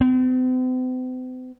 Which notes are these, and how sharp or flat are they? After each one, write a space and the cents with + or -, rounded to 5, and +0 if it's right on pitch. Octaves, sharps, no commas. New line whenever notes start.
C4 -45